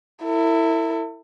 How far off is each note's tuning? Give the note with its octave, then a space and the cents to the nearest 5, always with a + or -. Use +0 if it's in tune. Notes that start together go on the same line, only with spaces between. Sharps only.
E4 +0 A4 +45